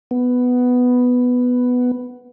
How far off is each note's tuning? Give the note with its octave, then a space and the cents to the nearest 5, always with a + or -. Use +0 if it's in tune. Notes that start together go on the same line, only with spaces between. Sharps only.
B3 +5